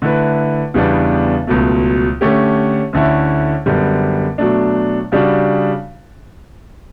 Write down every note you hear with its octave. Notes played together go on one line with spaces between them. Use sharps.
D3 A3 E4 B4
E2 C#3 G3 B3 D4
C#2 B2 F#3 A3
D3 A3 C#4 G4
D2 D3 A3 C#4 E4
F#2 D3 G3 B3
B2 F#3 A3 D4
C#3 G3 D4 F#4